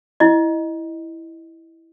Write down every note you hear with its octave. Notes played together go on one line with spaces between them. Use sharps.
E4 D#5